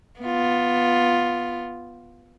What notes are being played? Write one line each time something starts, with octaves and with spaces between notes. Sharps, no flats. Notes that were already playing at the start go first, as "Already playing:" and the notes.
B3 F4